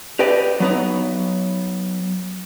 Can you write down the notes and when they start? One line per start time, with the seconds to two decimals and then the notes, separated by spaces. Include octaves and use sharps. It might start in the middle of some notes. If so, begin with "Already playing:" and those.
0.19 G4 B4 D5 D#5 G5
0.60 F#3 B3 D#4